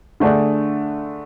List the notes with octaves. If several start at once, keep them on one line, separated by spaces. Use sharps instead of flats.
D3 A3 D4 G#4 D5